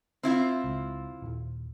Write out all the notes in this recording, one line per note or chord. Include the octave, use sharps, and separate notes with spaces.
C4 E4 F4
C#2
D#1